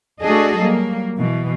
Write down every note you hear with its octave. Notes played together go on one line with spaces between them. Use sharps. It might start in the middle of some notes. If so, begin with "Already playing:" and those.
A3 D4 F#4 G#4 A4 D#5
F#3 G3 A#3
B2 E3